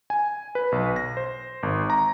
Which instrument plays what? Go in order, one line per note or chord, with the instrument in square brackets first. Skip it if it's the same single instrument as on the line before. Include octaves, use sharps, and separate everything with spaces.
[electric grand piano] G#5
B4
B1
A#6
C5
G#1
A#5